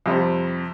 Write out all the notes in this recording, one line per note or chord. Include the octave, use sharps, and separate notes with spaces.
F2 C3 G3